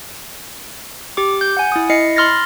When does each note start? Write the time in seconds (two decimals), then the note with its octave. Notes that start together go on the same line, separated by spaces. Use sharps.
1.17 G4 D6
1.41 G6
1.57 F#5 G#5
1.72 E4 D#6
1.90 E4 D#5 C7 C#7
2.16 B5 C6 F6 A6 A#6